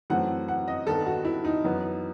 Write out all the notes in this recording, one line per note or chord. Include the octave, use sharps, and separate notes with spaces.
F#2 E3 A3 C4 F#5
F#5
D#5
G2 D#3 G3 B3 A4
F#4
E4
D#4
F#2 E3 B3